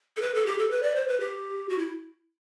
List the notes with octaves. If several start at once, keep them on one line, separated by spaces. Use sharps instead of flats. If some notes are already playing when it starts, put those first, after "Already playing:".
A4
B4
A4
G4
A4
B4
D5
C5
B4
G4
F#4
E4